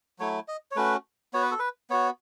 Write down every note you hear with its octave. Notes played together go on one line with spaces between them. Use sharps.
F#3 A3 E4 C#5
D#5
C#5
A3 C#4 F#4 B4
B3 F#4 C#5
B4
A4
B4
B3 F#4 C#5